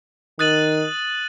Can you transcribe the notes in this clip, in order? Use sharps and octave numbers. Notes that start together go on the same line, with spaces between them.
D#3 D#6 F#6 A6 D#7 F#7